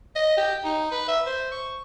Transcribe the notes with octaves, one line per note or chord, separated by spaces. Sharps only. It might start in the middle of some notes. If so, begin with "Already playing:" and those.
D#5
G4
D#4
B4
E5
C5
C#6